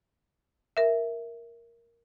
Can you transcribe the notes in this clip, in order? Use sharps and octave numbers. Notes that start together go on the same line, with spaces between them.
A#4 E5